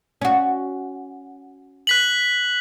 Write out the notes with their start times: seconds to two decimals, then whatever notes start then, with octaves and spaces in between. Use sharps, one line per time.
0.21 C#4 F#4
1.87 F#6 B6 F#7